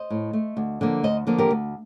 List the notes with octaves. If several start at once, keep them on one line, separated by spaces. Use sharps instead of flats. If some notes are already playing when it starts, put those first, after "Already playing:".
Already playing: C5 D#5
A2
A3
D2
D3 F3 A#3
D2 C5 D#5
D3 F3 A#3
G4 A#4
D2